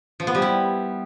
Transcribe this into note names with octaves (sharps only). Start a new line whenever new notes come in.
F3
B3
G3
E4